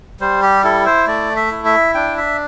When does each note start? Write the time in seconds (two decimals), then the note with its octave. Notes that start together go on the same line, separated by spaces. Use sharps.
0.20 G3 C5
0.42 G4
0.64 E4 A4
0.86 C5
1.07 A3 D5
1.36 E5
1.51 E4
1.65 E5
1.95 D4 G5
2.17 E5